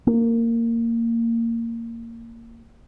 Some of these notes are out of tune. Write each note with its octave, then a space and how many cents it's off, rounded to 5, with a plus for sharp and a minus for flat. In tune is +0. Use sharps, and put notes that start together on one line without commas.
A#3 -15